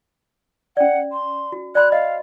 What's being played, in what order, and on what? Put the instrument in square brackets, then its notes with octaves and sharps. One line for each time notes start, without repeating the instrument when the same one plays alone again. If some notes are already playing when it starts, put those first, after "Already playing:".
[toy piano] C#4 D5 [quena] F#5
[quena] C6
[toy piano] F#4
[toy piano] D5 B5 C6 [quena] F#6
[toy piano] D#5 [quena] F5